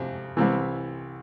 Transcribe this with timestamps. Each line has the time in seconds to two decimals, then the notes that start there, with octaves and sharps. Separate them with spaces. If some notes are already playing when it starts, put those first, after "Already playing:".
Already playing: F2 C3
0.37 C2 C3 E3